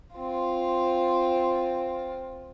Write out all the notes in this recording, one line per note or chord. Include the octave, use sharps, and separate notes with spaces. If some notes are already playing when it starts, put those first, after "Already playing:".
C4 F4